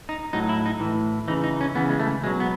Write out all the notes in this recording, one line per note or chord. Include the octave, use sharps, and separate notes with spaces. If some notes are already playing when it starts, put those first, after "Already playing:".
D#4
A2 F#3 D#4
E4
D#4
A2 E3
C#3 E3 D#4
D#4
C#4
C#3 E3 B3
G#3
A3
B2 F#3 G#3
B3